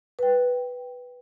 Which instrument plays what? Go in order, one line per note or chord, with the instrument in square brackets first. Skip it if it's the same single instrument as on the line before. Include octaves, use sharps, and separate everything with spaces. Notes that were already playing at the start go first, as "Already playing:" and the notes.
[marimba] B4 G5